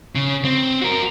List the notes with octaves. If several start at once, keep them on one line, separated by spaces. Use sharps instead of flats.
C#3
C4
F#4 A#4